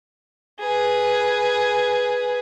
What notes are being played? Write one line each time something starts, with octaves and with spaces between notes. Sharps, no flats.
G#4 B4